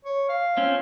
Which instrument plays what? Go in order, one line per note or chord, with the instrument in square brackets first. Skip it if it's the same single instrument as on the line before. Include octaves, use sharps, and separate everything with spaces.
[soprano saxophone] C#5
F5
[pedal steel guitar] C4 C#4 F4